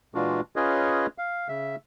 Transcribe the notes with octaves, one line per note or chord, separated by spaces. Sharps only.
A#2 E3 G#3 D4 F4 F#4
C#4 F4 G#4 B4 C#5 D#5
F5
C#3 E5